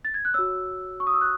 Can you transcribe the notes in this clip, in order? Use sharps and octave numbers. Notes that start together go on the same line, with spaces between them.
A6
G#6
F#6
F#4 C#5 E6
C#6
D#6
E6
F#6